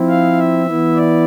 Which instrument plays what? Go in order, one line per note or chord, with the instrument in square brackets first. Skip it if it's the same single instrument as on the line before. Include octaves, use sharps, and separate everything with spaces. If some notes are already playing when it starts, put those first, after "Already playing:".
Already playing: [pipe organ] F3 C4 E4
F5
E5
E3 B3 E4
D5